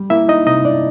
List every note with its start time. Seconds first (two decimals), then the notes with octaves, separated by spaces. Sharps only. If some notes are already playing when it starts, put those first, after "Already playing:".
Already playing: G3
0.10 A#3 E4 E5
0.29 D#4 D#5
0.47 C3 D#4 D#5
0.65 D4 D5